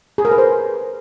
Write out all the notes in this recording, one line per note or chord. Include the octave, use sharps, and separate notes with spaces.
G#4
A#4
B4
C5